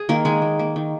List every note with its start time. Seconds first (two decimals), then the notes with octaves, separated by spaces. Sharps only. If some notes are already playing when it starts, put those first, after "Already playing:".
Already playing: G#4
0.09 D#3 A#3 A#4
0.25 D#3 G#3 G#4
0.42 A#3
0.59 A#3
0.76 D#3